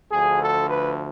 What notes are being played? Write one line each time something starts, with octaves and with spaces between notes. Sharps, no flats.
D2 D3 F3 G#4
A4
B4